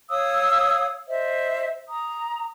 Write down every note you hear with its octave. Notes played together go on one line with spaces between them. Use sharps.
C#5 F5 D#6 E6
C5 D#5 E5
A#5 D#6